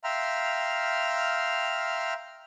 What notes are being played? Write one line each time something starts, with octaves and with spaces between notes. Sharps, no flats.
E5 F5 G5 A#5 C6 F6